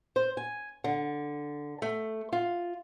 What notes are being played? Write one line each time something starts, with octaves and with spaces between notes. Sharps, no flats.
C5
G#5
D3
A3
F4